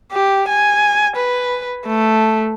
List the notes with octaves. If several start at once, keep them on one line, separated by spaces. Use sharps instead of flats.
G4
G#5
B4
A3